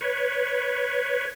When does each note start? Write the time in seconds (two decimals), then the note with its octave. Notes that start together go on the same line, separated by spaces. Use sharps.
0.01 B4 C#5